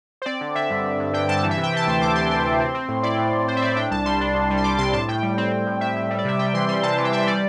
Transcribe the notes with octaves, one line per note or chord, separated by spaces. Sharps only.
C5
C4 D5
D3
D3 E5
G2
G2
G2
D3 G5
G2 A5
E3
E5
C3
G5
E3 A5
D2 C6
D2 D6
E3 C6
C3 C6
C3
C4
C4
A2
E4 D5
A2
A2
A2 C5
E5
A2 D5
D4 G5
C2 A5
G3 C6
D4
C2
G3
C6
G3 D6
C3 C6
A2 A5
A2 G5
G3
C4
C4
A2
A2 E5
A2
G3
D5
C3 E5
G3 G5
E3 C6
G3 C6
C3 A5
E3 A5
G5
E3 E5
G5
G3 D5